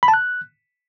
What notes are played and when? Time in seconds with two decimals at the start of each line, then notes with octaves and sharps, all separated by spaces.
0.03 B5
0.08 A5
0.14 F#6